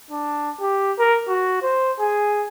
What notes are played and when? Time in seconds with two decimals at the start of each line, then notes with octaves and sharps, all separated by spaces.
0.11 D4
0.60 G4
0.98 A#4
1.28 F#4
1.62 C5
1.99 G#4